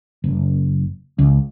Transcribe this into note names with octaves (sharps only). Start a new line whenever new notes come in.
F#1
C#2